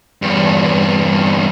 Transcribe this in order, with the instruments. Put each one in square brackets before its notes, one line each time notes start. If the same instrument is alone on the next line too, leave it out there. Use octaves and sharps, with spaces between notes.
[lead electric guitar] E2 G2